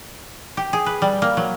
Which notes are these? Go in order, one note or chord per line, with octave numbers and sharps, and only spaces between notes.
G4
G#4
B4
G3
A#3
F#3